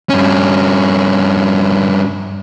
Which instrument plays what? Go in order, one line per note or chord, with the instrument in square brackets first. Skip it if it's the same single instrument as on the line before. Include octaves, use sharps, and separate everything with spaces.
[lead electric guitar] G2 C#4